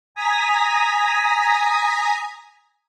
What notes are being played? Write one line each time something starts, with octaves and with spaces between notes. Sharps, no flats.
G#5 A#5 D#6 A#6 B6